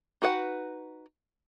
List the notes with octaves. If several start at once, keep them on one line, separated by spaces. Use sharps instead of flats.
D#4 F#4 B4 F#5